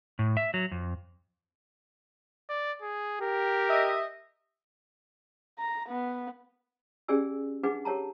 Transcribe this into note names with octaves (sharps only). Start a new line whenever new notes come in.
A2
E5
F#3
F2
D5
G#4
G4 A#4
D#5 E5
A#5
B3
C#4 G4 G#4 D5 G#5 E6
D4 D#4 G#4 B4 F#5 D6
G4 A#4 C#5 A5 A#5